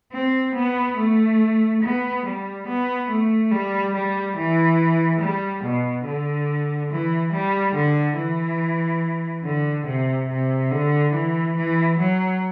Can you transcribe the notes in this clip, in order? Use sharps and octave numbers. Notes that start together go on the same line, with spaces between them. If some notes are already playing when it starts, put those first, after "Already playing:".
C4
B3
A3
B3
G3
B3
A3
G3
G3
E3
G3
B2
D3
E3
G3
D3
E3
D3
C3
C3
D3
E3
E3
F#3